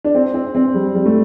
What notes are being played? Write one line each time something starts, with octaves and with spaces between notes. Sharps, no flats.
D4
C4
C4
C4
G3
G3
A3